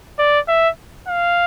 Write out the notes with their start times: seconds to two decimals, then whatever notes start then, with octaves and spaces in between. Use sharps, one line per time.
0.19 D5
0.48 E5
1.08 F5